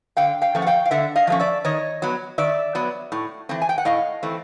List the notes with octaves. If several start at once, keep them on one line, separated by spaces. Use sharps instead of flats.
D3 F5 G5
F5 G5
F3 A3 C#4
F#5
F5 G5
F5
D3 E5 F#5
D#5 F5
F3 A3 C#4
D5 E5
D#3 C#5 D#5
F#3 B3
D#3 D5 E5
F#3 B3
A2
E3 A3 C4
G#5
G5
F#5
A2 D#5 F5
E3 A3 C4